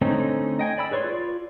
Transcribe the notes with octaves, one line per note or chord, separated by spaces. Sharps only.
D3 A3 C4 C#4 D#4
D#5 G5 G#5
D5 B5 E6
G#4 B4 C#5 D5 C6
F4 D5